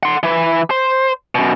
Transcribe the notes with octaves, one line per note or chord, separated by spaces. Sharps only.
F#5 C6
E3 B4
C5
F#2 B2